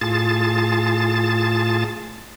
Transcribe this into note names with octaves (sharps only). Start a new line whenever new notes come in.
A2 F4 G#4 A5 A6